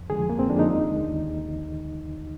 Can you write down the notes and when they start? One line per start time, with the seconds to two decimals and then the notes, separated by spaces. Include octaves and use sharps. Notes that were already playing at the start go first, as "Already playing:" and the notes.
Already playing: F2
0.10 D3 F3 G#3 G#4
0.29 F2 A#3
0.39 C4
0.49 D3 F3 G#3 D4
0.59 D#4
0.69 D#2
0.89 D3 G#3
1.08 D#2